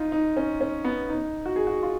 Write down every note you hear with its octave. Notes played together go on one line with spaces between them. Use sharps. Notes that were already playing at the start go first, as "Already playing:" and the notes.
Already playing: D#4 F4
D#4
C#4
C#4
B3
D#4
F#4
G#4
F#4
F4